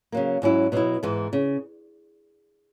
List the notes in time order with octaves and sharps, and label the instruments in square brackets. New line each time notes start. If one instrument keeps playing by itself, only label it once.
[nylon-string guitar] C#3 F#3 A#3
G#2 F#3 C#4 E4
B2 F#3 B3 E4
G#2 E3 B3
C#3